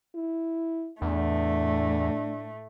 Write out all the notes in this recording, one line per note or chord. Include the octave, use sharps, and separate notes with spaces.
E4
E2 A2 A3 D4